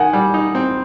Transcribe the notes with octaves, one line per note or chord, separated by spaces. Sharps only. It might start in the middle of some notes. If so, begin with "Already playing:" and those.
Already playing: D#3 F#5 G#5
G3
D#4
C4